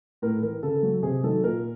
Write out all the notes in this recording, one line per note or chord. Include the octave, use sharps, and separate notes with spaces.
A2 A#4
E3 A#4
C#3 A4
F#3
C3 G#4
D#3 F#3 A4
A#2 A#4